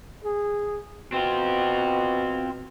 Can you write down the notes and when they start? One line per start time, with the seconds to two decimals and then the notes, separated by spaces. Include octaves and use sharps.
0.24 G#4
1.12 B2 C4 F4